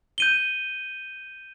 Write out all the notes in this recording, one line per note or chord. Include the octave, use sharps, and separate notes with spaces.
G6 D#7 G7